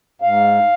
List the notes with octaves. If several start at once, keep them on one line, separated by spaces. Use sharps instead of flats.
G#2 F5